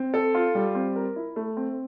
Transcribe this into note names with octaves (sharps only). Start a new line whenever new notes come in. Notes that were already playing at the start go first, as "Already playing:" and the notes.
Already playing: C4
A4
F4
G3
C4
A#4
E4
A3
C4